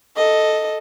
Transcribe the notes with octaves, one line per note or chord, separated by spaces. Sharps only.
A4 D#5